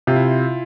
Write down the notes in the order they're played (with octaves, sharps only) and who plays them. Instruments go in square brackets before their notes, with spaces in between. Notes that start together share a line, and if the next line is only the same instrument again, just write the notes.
[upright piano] C3 [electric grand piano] F4
[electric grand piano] E4